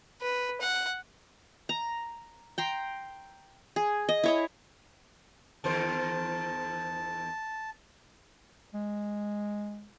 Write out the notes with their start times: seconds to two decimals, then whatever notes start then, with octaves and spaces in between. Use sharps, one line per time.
0.22 B4
0.61 F#5
1.69 A#5
2.58 G5 A#5 C6
3.76 G#4
4.09 D#5
4.24 E4 C#5 D#5
5.64 E2 D#3 C5 A5
8.74 G#3